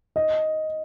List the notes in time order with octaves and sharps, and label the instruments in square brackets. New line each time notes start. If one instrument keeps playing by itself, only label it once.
[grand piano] D#5